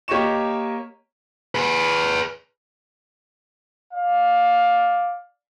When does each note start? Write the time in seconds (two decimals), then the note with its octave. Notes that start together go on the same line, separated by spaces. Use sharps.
0.08 A#3 G4 C#5 D#5 C#6 E7
1.55 G#4 B4
3.93 D5 F5